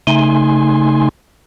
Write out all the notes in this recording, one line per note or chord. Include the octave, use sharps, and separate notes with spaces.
C#3 A3 D#4 G#5 C6